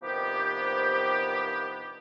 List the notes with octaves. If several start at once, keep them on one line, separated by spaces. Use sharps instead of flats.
G2 C3 D#3 F3 B3 G4